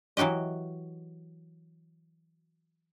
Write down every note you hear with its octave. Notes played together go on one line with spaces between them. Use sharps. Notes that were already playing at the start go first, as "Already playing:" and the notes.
E3 F#3 F#4 G4 D#5